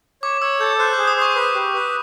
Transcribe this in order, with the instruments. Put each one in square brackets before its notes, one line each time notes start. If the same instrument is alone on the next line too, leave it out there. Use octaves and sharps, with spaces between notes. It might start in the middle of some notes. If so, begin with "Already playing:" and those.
[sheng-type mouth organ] C#5 [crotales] D6
[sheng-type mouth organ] C#5 [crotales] E6
[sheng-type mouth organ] A4 [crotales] G6
[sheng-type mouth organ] C5 [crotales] F#6
[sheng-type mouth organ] G#4 [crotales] D6
[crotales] D#6
[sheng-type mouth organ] C5
[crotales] C#6
[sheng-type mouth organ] B4
G4
B4